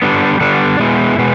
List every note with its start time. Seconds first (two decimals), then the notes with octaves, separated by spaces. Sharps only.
0.02 D3 G3 B3 D4
0.40 D3 G3 B3 D4
0.79 B2 G#3 B3 E4
1.18 B2 G#3 B3